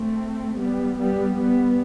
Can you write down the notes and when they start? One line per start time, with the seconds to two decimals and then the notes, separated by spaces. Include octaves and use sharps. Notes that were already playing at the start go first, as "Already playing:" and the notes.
Already playing: A3 C4
0.57 G3 B3
0.98 G3 B3
1.37 G3 B3